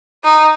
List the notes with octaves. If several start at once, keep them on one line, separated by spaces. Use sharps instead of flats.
D#4